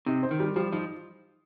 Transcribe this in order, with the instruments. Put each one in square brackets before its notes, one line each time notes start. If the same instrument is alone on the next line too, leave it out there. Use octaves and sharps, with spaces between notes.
[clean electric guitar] C3 [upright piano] D#4
[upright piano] C5
[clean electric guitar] D#3
[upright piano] G3
[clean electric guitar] F3 [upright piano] G3
[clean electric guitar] F3 [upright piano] D#4